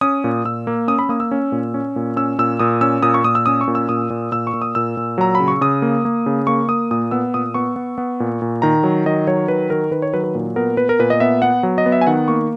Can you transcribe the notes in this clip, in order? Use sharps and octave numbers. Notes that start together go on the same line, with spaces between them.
C#4 D#6
A#2
A#2 E6
A#3
C#4 D#6
B5
A#3 D#6
E6
C#4
A#2
C#4
A#2
C#4 E6
A#2 E6
A#2 D#6
C#4 E6
A#2 D#6
C#6
A#2 D#6
E6
C#4 D#6
C#6
A#2
E6
A#2 D#6
A#2
A#2 E6
C#6
A#2
D#6
A#2 E6
A#2
F#3 A#5
B5
C#3
C#6
C#3 D#6
A#3
A#3
C#3
A#3 C#6
A#3 D#6
A#2 D#6
B3 E6
A#2 D#6
B3 C#6
B3
B3
A#2
A#2
D#3 A#5
F#3
D#3 D#5
F#3 C#5
D#3 B4
D#3 A#4
D#3 B4
C#5
F#3 B4
B4
A#2
B3 A#4
B3 B4
A#4
A#2 B4
D#5
B3 E5
B3 F#5
F#3
D#5
B3
E5
G#5
D#3 F#5
A#3 C#6